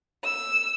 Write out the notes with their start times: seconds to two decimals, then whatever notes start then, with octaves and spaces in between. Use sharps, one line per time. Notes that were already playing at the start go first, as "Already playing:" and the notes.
0.24 E6